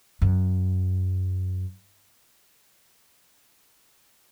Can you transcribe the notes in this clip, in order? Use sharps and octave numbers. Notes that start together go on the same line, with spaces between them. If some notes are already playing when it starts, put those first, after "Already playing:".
F#2